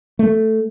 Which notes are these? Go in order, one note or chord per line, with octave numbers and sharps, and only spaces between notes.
A3